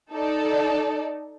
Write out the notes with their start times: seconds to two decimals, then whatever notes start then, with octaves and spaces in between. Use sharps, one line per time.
0.12 D#4 A4 D5